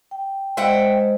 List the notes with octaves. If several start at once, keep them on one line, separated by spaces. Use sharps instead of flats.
G5
G#3 C5 D#5 E5 F#5 G5